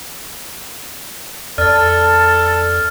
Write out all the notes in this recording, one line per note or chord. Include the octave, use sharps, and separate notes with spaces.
F2 A4 D5 F6 A6